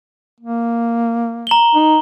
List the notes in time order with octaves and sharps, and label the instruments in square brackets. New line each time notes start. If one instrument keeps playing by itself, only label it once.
[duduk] A#3
[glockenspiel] A#5 F#7 G7
[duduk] D#4